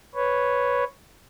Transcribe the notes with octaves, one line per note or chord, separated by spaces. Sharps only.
B4 C#5